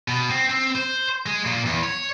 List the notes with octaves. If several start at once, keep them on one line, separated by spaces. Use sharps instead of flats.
B2
C4
C4
C5
G#3
A#2
E2
C#5